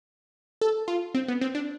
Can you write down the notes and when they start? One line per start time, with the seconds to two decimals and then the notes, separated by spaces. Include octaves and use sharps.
0.61 A4
0.88 F4
1.15 C4
1.28 B3
1.41 C4
1.55 D4